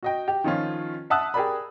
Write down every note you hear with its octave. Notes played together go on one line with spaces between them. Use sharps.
F#4 D#5 G5
G4
D#3 F3 C#4 F4
E5 F#5 A5 D#6 E6 F#6
G4 G#4 A#4 D5 B5